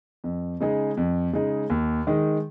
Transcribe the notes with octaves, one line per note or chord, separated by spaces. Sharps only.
F2
C#3 G#3 D#4 G#4
F2
C#3 G#3 D#4 G#4
D#2
D#3 G#3 D#4